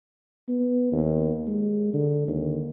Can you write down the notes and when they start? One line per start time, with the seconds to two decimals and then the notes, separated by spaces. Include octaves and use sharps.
0.48 B3
0.92 D#2
1.47 G#3
1.93 D3
2.28 D#2